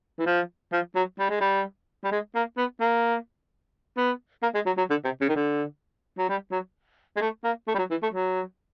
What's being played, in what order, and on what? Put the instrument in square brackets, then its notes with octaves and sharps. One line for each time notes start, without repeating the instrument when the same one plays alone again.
[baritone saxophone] E3
F3
F3
F#3
G3
G#3
G3
G3
G#3
A#3
B3
A#3
B3
A#3
G#3
F#3
F#3
D3
C3
C#3
D#3
D3
F#3
G3
F#3
G#3
A3
A#3
A3
G3
F#3
E3
A3
F#3